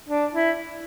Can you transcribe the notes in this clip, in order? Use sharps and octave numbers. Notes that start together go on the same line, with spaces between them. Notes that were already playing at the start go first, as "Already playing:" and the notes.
D4
E4